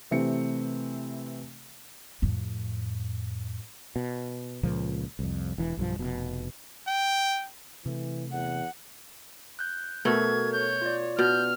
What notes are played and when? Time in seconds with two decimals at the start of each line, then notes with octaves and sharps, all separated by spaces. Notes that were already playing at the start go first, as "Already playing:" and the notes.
0.11 C3 E3 A3 C4 G4 C#7
2.22 F2 A2
3.96 B2
4.63 C#2 A#2 F3 A#3
5.19 C2 F2
5.58 E1 E3
5.77 B1 G2 F3
5.99 F1 B2
6.87 G5
7.86 C3 E3 A3
8.32 E2 F#5
9.59 F#6 G6
10.05 B2 A3 F#4 A4 A#4 G#6
10.53 C#5 G6
10.82 F4 D5
11.19 B2 F6 G6